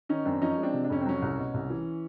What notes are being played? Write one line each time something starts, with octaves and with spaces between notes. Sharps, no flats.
D#3 C#4 D#4
F#2 C4 D4
F3 C#4 D#4
G#3
C4 D4
C3
D4
F2 C#4
C4
F#3 C#4
C2
B2
C2
E3